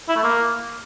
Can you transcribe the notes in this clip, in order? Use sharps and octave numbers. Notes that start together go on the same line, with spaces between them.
E4
A3
A#3